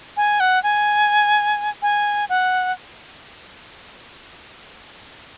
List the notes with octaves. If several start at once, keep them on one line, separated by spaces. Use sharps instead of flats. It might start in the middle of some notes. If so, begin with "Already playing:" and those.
G#5
F#5
G#5
G#5
F#5